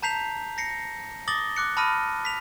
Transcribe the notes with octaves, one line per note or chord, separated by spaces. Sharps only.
A5 A#5 G6 B6 C7 F7
A#6 C7 C#7
D6 D#6 A6 A#6 F#7 G7
D6 F#6 C#7
A5 B5 D#6 F6 A#6 D#7
B6 F7